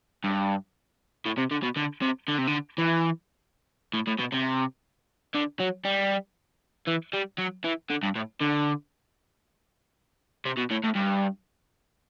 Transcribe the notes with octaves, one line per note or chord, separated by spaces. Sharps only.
G2
A2
C3
D3
B2
D3
C3
D3
C3
D3
E3
A2
A2
B2
C3
D3
F#3
G3
E3
G3
F#3
E3
D3
G2
A2
D3
C3
B2
A2
A2
G2